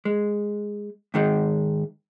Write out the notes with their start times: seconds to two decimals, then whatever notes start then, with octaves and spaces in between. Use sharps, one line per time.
0.05 G#3
1.14 G#2 D#3 G#3